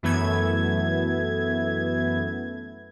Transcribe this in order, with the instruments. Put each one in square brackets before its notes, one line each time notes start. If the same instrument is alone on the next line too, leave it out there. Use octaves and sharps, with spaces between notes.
[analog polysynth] F#2 E3 A3 B3 E5 G#6